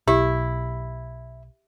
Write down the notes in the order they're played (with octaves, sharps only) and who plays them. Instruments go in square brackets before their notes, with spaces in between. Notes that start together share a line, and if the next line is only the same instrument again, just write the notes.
[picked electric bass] B1 [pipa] E4 [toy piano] G4